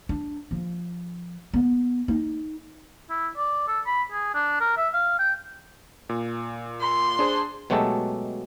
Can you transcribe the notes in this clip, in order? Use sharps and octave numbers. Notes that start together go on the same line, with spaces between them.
D4
F3
B3
D#4
E4
D5
A4
B5
G#4
D4
A#4
E5
F5
G5
A#2
C6
D4 G#4 C5
B2 F#3 G#3 A3 G4 A4